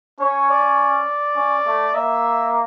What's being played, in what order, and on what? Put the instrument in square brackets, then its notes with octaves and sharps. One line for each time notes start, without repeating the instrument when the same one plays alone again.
[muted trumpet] C#4 [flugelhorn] C#5
[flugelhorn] D5
[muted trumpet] C#4
A3
[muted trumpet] A#3 [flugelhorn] E5